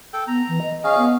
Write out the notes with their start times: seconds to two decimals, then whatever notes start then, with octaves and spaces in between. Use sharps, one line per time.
0.13 A4 G5
0.28 B3 A#5
0.48 E3
0.62 D#5
0.84 C#4 G#4 F5
0.98 B3